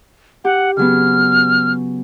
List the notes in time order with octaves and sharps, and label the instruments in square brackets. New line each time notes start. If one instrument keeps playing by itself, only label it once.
[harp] G4 [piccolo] F#5
[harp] C#3 F#3 B3 [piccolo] F6